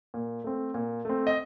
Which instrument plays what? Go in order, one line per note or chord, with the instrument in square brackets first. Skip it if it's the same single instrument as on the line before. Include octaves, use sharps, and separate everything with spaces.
[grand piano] A#2
A3 C4
A#2
A3 C4
D#5